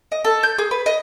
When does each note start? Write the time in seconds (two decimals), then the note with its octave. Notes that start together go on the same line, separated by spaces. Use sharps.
0.12 D#5
0.24 A4
0.43 G6
0.58 G#4
0.71 B4
0.86 D#5